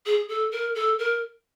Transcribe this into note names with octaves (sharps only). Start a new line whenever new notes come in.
G#4
A4
A#4
A4
A#4